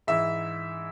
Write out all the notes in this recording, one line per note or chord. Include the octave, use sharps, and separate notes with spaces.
G#2 E3 E5